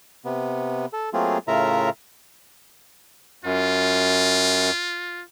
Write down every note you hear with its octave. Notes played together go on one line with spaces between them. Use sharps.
C3 B3
A4
F#3 A3 A#3 C4 F4 G#4
A2 C#3 F4 A#4 E5 A#5
F#2 F4